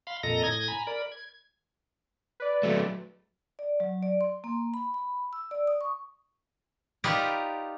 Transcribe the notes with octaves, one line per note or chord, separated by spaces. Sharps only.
F5 B5 C6
F2 A#2 A4 D#5 A#5 A#6
A2 D#6 G#6 A#6
G#5 A#5 B5
A#4 D5 B5
G#6
B4 D5
F#3 A3
D5
F#3
D5
C6
A#3
B5
B5
E6
D5
D#6
C#6
D#4 F4 G4 A#4 B4 D5